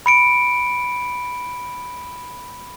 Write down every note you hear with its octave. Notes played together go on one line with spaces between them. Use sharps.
B5 C#7 D7